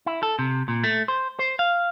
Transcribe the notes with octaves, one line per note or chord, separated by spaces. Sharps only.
E4
A4
C3
A#2
A3
C5
C5
F5